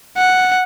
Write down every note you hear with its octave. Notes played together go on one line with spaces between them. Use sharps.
F#5